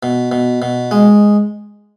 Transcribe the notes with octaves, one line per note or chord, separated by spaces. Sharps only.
B2
B2
B2
G#3